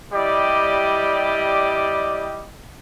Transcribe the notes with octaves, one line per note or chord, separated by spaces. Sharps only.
G3 E4 G4 D5 D#5